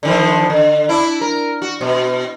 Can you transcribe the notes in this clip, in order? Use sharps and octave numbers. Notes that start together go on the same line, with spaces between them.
D3 D#3 F3
D3
D4 E4
A#4
F#4
B2